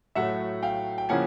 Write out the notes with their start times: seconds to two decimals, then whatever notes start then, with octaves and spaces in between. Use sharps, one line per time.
0.15 A2 F#3 A3 E5 F#5
0.63 F5 G5
0.98 G5
1.09 C#3 F3 A#3 C#4 E4 F#5 G#5